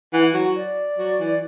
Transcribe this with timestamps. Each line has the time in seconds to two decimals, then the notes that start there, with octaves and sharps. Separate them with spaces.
0.13 E3 F#5
0.34 F#3 F#5
0.56 D5
0.98 F#3
1.20 E3